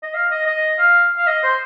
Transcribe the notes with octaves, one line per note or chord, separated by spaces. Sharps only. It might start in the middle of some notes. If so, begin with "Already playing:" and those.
D#5
F5
D#5
D#5
F5
F5
D#5
C5